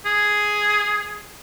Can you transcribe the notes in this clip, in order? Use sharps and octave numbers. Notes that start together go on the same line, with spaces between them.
G#4